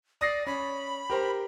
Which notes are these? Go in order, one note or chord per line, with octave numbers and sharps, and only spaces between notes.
D5 D#6 A#6 C7
C#4 B5
G4 A#4 C5